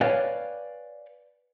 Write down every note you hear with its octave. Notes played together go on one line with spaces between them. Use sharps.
B4 C#5 D5 F5 G5 G#5